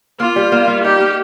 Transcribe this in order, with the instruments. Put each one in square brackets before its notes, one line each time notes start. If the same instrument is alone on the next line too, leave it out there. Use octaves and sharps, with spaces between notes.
[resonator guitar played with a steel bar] A#3 [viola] F4
[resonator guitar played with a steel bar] G3
A#3
G3
[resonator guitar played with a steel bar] D#4 [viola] G4
[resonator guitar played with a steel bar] A#3